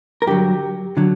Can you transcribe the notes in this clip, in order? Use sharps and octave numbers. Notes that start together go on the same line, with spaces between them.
A#4
G2 D3 F#3 G4
D3 F#3